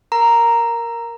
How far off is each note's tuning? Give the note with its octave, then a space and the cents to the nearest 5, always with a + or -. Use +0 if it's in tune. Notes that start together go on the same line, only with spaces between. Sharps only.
A#4 +0 A#5 +0